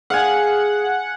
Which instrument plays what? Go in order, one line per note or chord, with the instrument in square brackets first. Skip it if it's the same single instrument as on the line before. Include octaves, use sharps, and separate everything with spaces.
[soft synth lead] G#4 [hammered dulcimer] F5 G#5 [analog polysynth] F#5